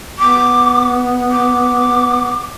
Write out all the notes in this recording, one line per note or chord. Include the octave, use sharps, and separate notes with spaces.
B3 D6
D6